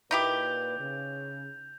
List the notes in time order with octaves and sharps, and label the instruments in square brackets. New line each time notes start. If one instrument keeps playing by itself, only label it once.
[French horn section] A#2 B4 [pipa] D#4 E4 G4 [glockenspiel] G6 F7
[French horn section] C#3